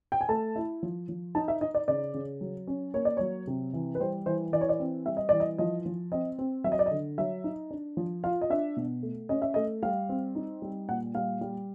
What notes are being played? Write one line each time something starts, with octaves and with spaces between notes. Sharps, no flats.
G5
G#5
A3 A5
E4
F3
F3
D#4 A5
E5
D#4 D#5
D5
C#3 D5
C#3
F#3
C#4
A#3 C#5
D5
F#3 C#5
C3
E3
B4
G3 C5
E3 C5
E3 D5
C#5
D5
C4
G3 E5
D#5
E3 D5
D#5
F3 D#5
F3
C4 D#5
C4
F#3 E5
D#5
D5
D#5
D3
F#3 E5
D#4
D4
F3
F4 F5
D#5
D4 E5
B2
A3
C#4 D#5
E5
A3 D#5
G3 F5
C4
D#4
G3
A#2 F#5
G3 F5
G3